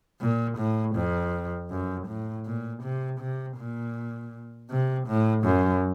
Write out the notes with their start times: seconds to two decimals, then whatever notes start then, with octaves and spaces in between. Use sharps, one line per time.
0.21 A#2
0.58 A2
0.96 F2
1.71 F#2
2.07 A2
2.46 A#2
2.83 C3
3.20 C3
3.58 A#2
4.71 C3
5.07 A2
5.44 F#2